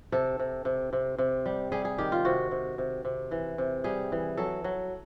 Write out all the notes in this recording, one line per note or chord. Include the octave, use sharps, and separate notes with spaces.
C3 A4
C3
C3
C3
C3
G3
G3 G#4
G#4
D#3 G4
F4
C3 F#4
C3
C3
C3
E3
C3
G3 G#4
E3
F#3 A4
F#3